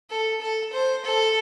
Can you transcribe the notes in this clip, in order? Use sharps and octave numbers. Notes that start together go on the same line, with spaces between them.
A4
A4
C5
A4